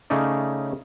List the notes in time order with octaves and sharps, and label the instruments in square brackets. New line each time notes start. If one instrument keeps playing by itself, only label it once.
[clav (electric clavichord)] C#3 A3 C#4 D#4 D5